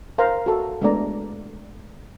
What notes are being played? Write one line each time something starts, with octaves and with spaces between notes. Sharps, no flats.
A#4 C5 F5 A#5
F#4 A4
G#3 A3 B3 D4 D5 A#5